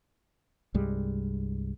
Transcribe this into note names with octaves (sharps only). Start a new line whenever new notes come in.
C2 G2 G3 G#3